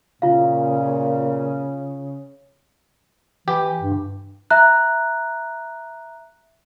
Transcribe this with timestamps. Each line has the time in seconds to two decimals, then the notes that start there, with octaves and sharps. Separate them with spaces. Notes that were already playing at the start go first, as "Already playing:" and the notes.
0.22 A#2 C#3 F4 F5
3.48 E3 G4
3.81 G2
4.50 E5 A#5 F#6